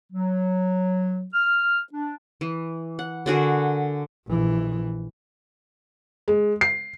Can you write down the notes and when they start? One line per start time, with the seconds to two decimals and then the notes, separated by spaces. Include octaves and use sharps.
0.13 F#3
1.34 F6
1.93 D4
2.41 E3
2.99 F#5
3.26 D3 F#4 G#4 A#4
4.27 A#1 E3
6.28 G#3
6.61 C7